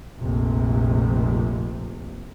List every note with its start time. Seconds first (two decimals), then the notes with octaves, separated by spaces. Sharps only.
0.19 F1 A#1 F2 C3